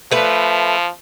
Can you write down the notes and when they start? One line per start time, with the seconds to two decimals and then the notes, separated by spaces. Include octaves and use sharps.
0.11 F3 A3 B4